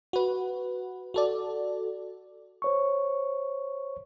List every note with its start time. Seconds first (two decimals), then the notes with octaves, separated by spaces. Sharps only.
0.13 F#4 B4
1.14 F#4 A4 D5
2.62 C5 C#5 C#6